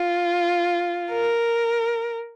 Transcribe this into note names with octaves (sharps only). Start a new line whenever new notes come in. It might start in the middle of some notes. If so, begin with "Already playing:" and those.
Already playing: F4
A#4